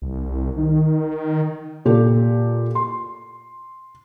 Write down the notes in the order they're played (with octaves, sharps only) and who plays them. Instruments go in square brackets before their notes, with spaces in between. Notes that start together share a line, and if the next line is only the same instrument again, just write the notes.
[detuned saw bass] C2
D#3
[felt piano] A#2 G4 A4
C6